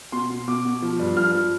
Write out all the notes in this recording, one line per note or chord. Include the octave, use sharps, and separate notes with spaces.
B2 C6
B2
B2 D6
B2
F3
G2
F3 F6
F3